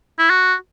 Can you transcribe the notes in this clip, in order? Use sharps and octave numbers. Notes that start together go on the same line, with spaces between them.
E4
F#4